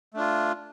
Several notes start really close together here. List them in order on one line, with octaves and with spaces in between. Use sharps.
A3 D4 F4